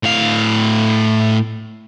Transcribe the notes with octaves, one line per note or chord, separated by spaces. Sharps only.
A2 F5